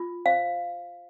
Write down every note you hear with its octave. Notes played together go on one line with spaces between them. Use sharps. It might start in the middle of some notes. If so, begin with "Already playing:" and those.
Already playing: F4
C5 F5